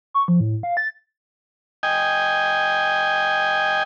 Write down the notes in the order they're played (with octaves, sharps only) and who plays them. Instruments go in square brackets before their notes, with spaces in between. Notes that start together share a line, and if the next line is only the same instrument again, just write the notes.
[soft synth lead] C#6
F3
A2
F5
A6
[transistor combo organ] D#5 G5 G#5